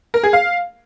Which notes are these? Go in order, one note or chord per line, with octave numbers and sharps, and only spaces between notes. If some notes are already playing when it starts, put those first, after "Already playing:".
A#4
G#4
F5